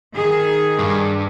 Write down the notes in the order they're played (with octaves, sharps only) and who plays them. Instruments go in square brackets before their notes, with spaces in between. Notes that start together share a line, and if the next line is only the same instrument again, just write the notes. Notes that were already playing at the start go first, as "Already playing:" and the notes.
[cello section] D#3 G#4
[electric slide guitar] G2